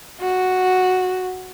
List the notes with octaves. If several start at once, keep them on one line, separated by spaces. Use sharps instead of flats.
F#4